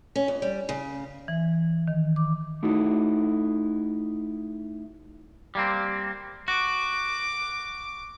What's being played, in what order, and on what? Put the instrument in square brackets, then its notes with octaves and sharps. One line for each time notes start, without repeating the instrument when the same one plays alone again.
[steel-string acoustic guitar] C#4
F2
G3
C#3
[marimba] E3
D#3
D6
[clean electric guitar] A3 D#4 E4 F#4
G3 A#3 C4
[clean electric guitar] F#4 [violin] D6